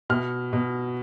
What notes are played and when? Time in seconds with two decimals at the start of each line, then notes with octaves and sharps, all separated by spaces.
0.10 B2 F6
0.53 B2